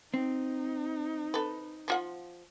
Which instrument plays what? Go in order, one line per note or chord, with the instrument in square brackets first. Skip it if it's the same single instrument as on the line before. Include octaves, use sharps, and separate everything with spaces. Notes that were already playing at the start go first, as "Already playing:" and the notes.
[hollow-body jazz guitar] C4 [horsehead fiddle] D#4
[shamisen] A4 B4
F3 F4 F#5